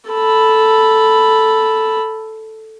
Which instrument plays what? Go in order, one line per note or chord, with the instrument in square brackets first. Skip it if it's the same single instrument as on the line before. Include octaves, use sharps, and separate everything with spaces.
[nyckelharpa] A4 B5